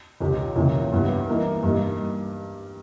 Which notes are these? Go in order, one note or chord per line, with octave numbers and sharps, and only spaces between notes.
C#2 C#3 G#3 D#4 G4
C#2 C#3 E3 A#3
G2 G3 B3 E4
E3 A#3 D#4 A#4
G2 G3 A#3 D#4